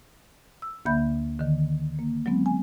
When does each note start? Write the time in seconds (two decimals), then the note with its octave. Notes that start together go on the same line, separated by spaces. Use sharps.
0.62 E6
0.86 D2 D3 A#3 E5 B5 G6
1.39 D3 D#3
1.99 A#3
2.26 F#3 G#3 B3 C4
2.46 G#5